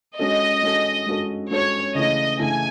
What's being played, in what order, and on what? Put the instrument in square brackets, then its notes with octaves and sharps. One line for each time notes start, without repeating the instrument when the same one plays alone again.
[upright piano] G#3 C#4 F#4 A4 [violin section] D#5
[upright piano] G#3 C#4 F#4 A4
G#3 C#4 F#4 A4
[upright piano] G#3 C#4 F#4 A4 [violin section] C#5
[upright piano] C#3 E3 A3 [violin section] D#5
[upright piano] C#3 E3 A3 [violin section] G#5